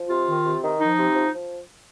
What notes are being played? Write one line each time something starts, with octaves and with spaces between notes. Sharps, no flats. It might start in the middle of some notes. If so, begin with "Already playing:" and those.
Already playing: F3
C3 F4
D#3
C3
D#3
F3 D#4
C3
F3
F3